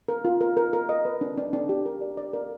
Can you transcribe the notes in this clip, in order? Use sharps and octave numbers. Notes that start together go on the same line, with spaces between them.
A#4
F4
A#4
A#4
A#4
D#5
B4
D4
D4
D4
G4
A#4
D5
D5
A#4